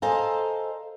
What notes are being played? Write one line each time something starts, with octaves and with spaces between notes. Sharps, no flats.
A4 C5 D#5 F5 G#5 A#5